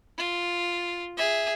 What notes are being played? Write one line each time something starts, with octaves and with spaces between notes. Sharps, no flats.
F4
G#4 E5